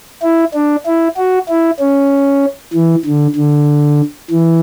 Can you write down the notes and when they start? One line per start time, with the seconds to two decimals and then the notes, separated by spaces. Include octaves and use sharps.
0.23 E4
0.54 D4
0.86 E4
1.17 F#4
1.49 E4
1.79 C#4
2.73 E3
3.05 D3
3.35 D3
4.30 E3